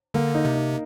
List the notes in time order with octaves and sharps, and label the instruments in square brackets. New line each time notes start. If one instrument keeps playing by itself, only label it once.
[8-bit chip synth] D3 [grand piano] A#3
[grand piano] D#4
[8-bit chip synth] C3
[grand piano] D#4